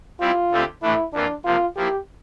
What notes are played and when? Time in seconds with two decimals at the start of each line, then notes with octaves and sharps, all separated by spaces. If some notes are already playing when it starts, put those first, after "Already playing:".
0.20 G3 C4 E4 F4
0.52 D2 D3 A3 C4 G4
0.82 A2 E3 A3 D4 E4
1.13 F2 E3 A#3 D4 F4
1.45 C3 F3 A#3 F4
1.76 F3 A#3 E4 G4